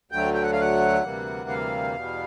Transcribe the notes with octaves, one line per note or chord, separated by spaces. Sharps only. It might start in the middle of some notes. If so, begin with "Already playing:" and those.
D2 D3 F#3 A3 G5
G5
F#5
F5
F#5
D2 C3 E3 G3 A#3
F5
E2 B2 G3 B3